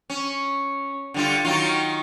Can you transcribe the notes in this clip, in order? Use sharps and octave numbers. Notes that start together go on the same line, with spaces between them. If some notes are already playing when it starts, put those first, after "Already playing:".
C#4
D3 G3 F4
D#3 F#3 F4